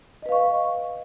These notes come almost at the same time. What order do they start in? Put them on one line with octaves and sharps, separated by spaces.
D#5 B4 F5 C#6